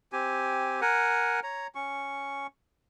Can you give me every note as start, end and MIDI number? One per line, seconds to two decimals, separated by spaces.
0.12 0.81 60
0.12 0.81 67
0.12 0.81 80
0.81 1.40 70
0.81 1.40 78
0.81 1.40 80
1.43 1.67 73
1.43 1.67 82
1.75 2.47 61
1.75 2.47 85